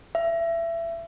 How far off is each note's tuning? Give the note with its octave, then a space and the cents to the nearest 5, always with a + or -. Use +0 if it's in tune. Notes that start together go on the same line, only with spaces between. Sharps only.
E5 +25